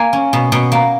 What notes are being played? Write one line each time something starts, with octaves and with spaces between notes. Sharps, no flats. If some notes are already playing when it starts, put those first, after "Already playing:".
Already playing: A#3 G#5
C#4
B2
B2
A#3